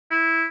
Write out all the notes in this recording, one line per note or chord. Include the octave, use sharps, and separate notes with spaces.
E4